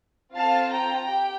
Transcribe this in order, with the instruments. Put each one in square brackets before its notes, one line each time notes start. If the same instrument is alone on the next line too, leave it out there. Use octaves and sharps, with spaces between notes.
[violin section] C4 F4 A4 F5 A5
G5 A#5
G4 G5